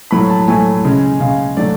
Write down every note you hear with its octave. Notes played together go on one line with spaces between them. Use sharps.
A2 F#3 A3 B5
A5
A2 F#3 A3 G#5
C#3 G#3
C#3 G#3 F5
D3 F#3 A3 D5